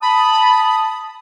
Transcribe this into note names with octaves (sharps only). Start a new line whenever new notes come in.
A5 B5 D#6